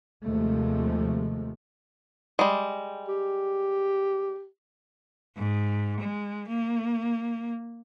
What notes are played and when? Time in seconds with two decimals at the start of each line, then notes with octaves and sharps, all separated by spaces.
0.25 D#2 C3 F3 G#3 A3
2.39 G3 G#3
3.09 G4
5.37 G#2
6.00 G#3
6.49 A#3